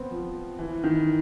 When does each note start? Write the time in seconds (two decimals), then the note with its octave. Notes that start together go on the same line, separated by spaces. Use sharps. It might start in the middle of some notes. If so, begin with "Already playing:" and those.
Already playing: B3 C4
0.11 F3
0.59 E3
0.84 D#3